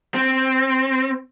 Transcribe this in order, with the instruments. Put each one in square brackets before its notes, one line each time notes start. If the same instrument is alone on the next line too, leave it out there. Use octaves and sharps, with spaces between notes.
[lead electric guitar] C4